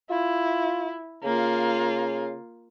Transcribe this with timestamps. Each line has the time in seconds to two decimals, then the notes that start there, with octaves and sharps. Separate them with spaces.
0.10 E4 F4
1.24 C#3 A#3 F4